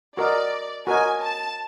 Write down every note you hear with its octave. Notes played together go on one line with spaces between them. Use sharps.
F#4 A#4 D5 D#5
F#4 A#4 D#5 G#5
A5